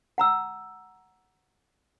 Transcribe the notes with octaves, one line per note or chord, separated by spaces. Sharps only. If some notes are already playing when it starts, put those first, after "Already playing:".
F#5 A#5 E6